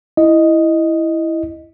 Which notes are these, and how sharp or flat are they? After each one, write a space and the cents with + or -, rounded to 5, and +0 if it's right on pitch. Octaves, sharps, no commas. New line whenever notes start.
E4 +0 D#5 +0